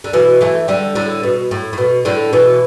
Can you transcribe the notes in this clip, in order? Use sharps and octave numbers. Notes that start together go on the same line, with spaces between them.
D3
B2 E3
E3 A3
D3 G3
A2 D3
B2
A2
A2
B2
A2 D3
B2 E3